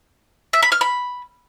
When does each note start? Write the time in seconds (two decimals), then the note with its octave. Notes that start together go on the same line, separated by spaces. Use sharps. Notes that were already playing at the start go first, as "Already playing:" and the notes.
0.53 E5
0.63 B5
0.72 F6
0.81 B5